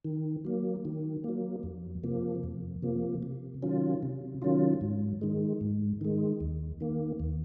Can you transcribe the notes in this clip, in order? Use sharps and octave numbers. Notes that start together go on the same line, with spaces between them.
D#3
F#3 A#3
D#3
F#3 A#3
F2
C3 F3 A#3
F2
C3 F3 A#3
C3
D#3 F#3 C#4 F4
C3
D#3 F#3 C#4 F4
G#2
D#3 G#3
G#2
D#3 G#3
D#2
D#3 A#3
D#2